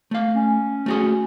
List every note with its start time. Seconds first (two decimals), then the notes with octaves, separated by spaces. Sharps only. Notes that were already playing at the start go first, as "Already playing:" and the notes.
0.11 A3 F5
0.34 C#4
0.86 A3 F#4 G#4